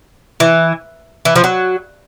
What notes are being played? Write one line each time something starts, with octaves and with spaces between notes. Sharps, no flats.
E3
E3
F3
F#3